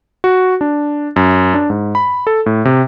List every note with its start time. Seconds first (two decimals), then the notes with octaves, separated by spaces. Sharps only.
0.24 F#4
0.61 D4
1.16 F#2
1.54 D4
1.70 G#2
1.95 B5
2.27 A4
2.46 A2
2.65 C3